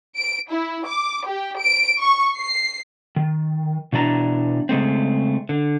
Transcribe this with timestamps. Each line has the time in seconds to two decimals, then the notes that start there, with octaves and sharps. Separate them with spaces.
0.17 D7
0.51 E4
0.86 D6
1.27 G4
1.59 D7
2.00 C#6
2.37 C7
3.16 D#3
3.93 B2 E3 D4 A#5
4.69 C#3 G#3 A3 C4
5.49 D3